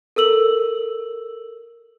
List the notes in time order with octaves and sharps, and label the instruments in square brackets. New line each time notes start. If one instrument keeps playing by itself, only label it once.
[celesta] A4 A#4 E6 F#7